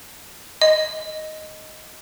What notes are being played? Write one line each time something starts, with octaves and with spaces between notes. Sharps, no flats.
D#5